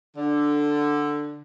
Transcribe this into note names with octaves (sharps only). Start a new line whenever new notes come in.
D3